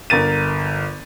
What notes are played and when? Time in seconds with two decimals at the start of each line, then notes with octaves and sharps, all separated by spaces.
0.10 G1 A#4 A6 D#7